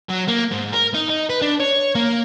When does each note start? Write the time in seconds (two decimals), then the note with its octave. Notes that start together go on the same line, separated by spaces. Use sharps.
0.10 F#3
0.28 A#3
0.51 G#2
0.73 A#4
0.94 D#4
1.09 D#4
1.29 B4
1.42 D4
1.60 C#5
1.95 A#3